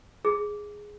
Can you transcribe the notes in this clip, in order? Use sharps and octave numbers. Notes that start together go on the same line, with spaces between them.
G#4